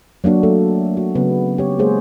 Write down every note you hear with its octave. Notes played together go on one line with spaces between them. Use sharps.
F#3 A#3 D4 F#4
F#3 A3 A4
F#4
C#3 F#3 B3 C#4
G4 C#5
G#3 A#3 G#4 C5 C#5